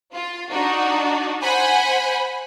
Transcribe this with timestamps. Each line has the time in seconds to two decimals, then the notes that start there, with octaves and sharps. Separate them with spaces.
0.14 F4
0.50 D4 D#4 F#4
1.42 C5 F#5 G#5 B5